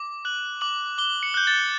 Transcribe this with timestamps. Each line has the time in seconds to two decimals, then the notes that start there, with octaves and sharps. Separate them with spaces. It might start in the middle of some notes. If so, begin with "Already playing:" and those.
Already playing: D6
0.25 F#6 F#7
0.61 D6 F#7
0.98 D6 G7
1.23 C#7
1.34 F#6 G6
1.47 A6